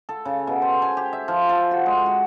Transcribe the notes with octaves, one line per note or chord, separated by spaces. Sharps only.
A4
C#3
B2
C5
G#5
G4
E5
F3
A4
F#4
G#3
F#4